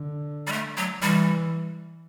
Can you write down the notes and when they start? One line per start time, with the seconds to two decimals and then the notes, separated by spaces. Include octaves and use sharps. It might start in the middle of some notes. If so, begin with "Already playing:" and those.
Already playing: D3
0.47 G3
0.52 A3
0.77 F#3
1.02 E3 G3